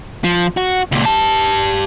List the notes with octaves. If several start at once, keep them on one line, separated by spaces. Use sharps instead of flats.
F3
F#4
C#2 A#2
G4 A5